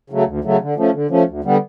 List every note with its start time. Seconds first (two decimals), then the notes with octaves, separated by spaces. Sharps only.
0.10 C#3 F#3 A3
0.26 D2
0.44 C#3 F#3 A3
0.61 D3
0.77 F3 A3 C#4
0.94 D3
1.10 F3 A3 C#4
1.27 D2
1.44 D3 G3 B3